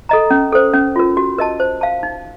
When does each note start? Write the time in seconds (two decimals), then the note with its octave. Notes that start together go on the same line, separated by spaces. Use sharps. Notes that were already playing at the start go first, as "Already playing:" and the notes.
0.09 A4 D#5 A#5
0.31 C#4
0.52 A4 C5
0.74 C#4
0.96 F4 A#4
1.17 F#4
1.38 A#4 D#5 A5
1.60 C5
1.81 F5 A5
2.03 D#4